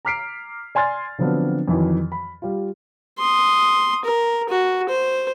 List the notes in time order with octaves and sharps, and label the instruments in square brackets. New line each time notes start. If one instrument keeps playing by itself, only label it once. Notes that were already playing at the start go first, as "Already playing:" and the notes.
[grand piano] A#5 D6 F6 B6 C7 D7
D5 G#5 C6 F6 A6
D3 F3 F#3 B3 C4 D4
F2 D#3 E3 F#3
B5
G3 F4
[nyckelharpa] C6 D#6
A#4
F#4
C5